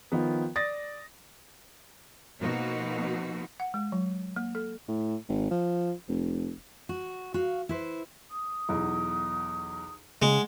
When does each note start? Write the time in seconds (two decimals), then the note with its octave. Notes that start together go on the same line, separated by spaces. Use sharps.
0.12 D#3 F3 B3
0.56 D5 D#6 A6 A#6
2.40 B2 F3 A#3 D#4 F#4
3.60 F#5
3.74 G#3
3.92 F#3
4.36 A#3
4.55 A4
4.88 A2
5.29 G#1
5.51 F3
6.08 F1
6.89 F#4
7.34 F#4 F5
7.69 E4 B4 C5
8.29 D#6
8.69 B1 E2
10.22 C#3 G#3 G#4 D#5 F#5